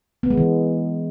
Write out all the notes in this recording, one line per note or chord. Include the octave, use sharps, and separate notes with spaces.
B3
G#3
E3